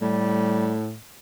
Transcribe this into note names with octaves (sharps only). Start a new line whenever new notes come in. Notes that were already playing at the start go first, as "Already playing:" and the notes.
A2 G3